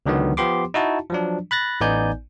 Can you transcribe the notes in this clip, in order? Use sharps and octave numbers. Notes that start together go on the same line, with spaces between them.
C#2 D3 D#3 F#3 B3
F3 B3 G4 C6 D6
D#4 E4 F#4 A5
F3 F#3 D4
B5 F#6 A6 A#6
A1 B3 D#4 D5 G#5 G6